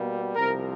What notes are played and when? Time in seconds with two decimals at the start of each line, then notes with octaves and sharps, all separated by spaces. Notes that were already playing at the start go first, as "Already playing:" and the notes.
Already playing: B2 G3 A#3
0.35 C2 C3 F3 A#4